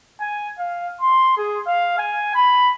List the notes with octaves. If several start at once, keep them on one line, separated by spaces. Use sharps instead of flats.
G#5
F5
C6
G#4
F5
G#5
B5